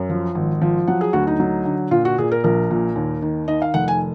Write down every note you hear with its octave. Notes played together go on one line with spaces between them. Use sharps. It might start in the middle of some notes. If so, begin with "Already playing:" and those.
Already playing: F#2
F3
G#1
F3
F#3 F#5
G#4
D2 F#4
D#4
F#3
D3
A#2 F4
F#4
A#2 G#4
A#4
A#1 A#4
A#2
D#2
D#3
D#3 D#5
F5
F1 F#5
G#5